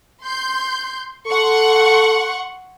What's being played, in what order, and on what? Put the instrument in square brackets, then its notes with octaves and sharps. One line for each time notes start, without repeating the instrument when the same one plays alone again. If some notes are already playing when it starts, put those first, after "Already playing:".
[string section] C6 G6
[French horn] A4 [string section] F#5 C6 C#6